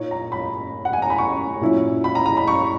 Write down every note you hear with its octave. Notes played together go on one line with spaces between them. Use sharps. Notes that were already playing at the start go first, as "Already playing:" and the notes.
Already playing: A#2 A#3 D#4 C#5
A#5
B5
F#5
G#5
A#5
B5
C#6
A#2 F#3 C#4 E4
B5
A#5
A#5
B5
C#6